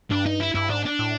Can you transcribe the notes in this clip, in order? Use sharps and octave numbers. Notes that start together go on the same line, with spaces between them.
G2 D4
D#4
E4
G2 E4
G#2 D4
D4
A2